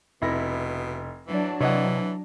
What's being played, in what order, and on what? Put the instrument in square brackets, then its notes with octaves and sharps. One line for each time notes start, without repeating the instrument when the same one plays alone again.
[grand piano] F1 E4 A#6 [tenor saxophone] B2
[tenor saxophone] E3 [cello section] F#3 D4
[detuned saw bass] C3 [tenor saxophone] E3 [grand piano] C#5 D#5 F#5